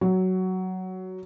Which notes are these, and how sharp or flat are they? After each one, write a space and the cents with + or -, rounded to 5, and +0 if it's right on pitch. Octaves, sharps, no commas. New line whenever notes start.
F#3 +10